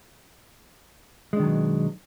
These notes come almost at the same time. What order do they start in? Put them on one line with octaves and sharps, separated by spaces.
G#3 D4 D#3 F#3 B2